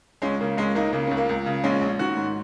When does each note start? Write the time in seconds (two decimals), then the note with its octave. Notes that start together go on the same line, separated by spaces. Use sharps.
0.22 C#2 G#3 C#4
0.41 C#3 A#3
0.57 C#2 G#3 C#4
0.75 C#2 A#3 D#4
0.93 C#3 A#3
1.07 C#2 C#4
1.17 A#3
1.29 C#2
1.46 C#3
1.64 A#1 G#3 C#4
1.81 A#1
1.99 D#3 C#4 F#4
2.17 G#2